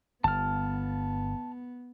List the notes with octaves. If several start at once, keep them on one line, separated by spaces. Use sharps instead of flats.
G1 B3 A5 F6